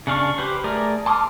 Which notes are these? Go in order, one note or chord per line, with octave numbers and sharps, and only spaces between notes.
C#3 D4 F5 C#6
G4 B4 C5
A3 G#4 A#4 D5
A5 C6 D6 D#6 F6